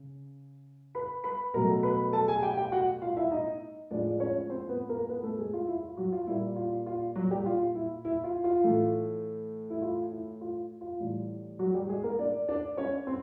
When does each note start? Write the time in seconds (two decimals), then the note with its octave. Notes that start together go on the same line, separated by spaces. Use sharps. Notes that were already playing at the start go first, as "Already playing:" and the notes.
Already playing: C#3
0.95 B4 B5
1.24 B4 B5
1.54 B2 F#3 A3 A#4 A#5
1.83 B4 B5
2.13 A4 A5
2.28 G#4 G#5
2.42 G4 G5
2.57 G4 G5
2.72 F#4 F#5
3.02 F4 F5
3.17 E4 E5
3.31 D#4 D#5
3.91 A2 F3 G#3 D4 D5
4.20 C#4 C#5
4.50 C4 C5
4.69 B3 B4
4.89 A#3 A#4
5.09 B3 B4
5.23 A3 A4
5.39 G#3 G#4
5.53 F4
5.67 E4
5.83 F4
5.97 F#3 F#4
6.12 F4
6.27 A#2 G3 A#3 E4
6.56 F4
6.86 F4
7.15 F#3 F#4
7.31 G3 G4
7.46 F4
7.75 E4
8.05 E4
8.24 F4
8.44 F4
8.64 A2 E3 A3
9.70 E4
9.82 F4
10.12 E4
10.41 F4
10.81 F4
11.00 A2 E3 G3
11.59 F#3 F#4
11.74 G3 G4
11.89 G#3 G#4
12.04 A#3 A#4
12.19 D4 D5
12.48 D4 D5
12.78 C#4 C#5
13.07 C4